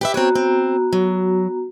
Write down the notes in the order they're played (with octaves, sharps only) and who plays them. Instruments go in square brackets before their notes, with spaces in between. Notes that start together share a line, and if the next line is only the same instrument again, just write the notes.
[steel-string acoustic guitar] G4 B4 E5
[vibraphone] B3 F#4 A#5 [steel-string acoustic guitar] C4 C#5
[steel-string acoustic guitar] C4
F#3